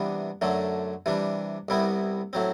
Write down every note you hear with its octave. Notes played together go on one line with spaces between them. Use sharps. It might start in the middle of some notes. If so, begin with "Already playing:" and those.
Already playing: C3 E3 G3 B3 D4
F#2 D3 F#3 A3
C3 E3 G3 D4
C2 C3 G3 B3 E4
A2 F#3 C4